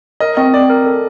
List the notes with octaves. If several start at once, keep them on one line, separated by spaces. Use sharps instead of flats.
A#4 D#5
C4 D#5
C4 D5
A#4
A4